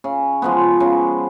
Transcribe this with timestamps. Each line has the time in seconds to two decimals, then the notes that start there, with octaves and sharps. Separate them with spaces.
0.04 C#3
0.42 F3 G#3 B3
0.80 C#3